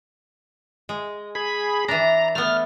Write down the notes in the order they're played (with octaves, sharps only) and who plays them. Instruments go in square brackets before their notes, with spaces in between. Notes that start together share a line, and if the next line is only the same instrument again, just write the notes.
[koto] G#3
[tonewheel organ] G#4 B5
[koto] E3 D4 [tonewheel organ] A#5
[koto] A3 B3 [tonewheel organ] F6